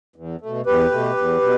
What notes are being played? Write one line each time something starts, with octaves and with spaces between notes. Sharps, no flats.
E2
B2 A3
E2 G4 B4
B2 A3
E2
B2